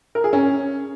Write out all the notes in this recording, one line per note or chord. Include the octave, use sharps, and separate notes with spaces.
A#4
G#4
C#4